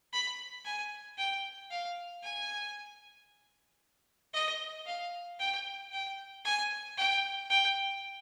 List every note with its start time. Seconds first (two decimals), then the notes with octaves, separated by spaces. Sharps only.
0.13 B5
0.65 G#5
1.18 G5
1.71 F5
2.23 G#5
4.33 D#5
4.86 F5
5.39 G5
5.92 G5
6.44 G#5
6.97 G5
7.50 G5